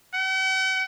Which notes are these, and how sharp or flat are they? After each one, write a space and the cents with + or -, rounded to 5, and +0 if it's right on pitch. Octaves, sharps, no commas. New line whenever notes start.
F#5 +45